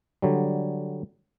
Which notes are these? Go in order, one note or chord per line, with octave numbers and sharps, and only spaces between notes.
D3 F#3 G3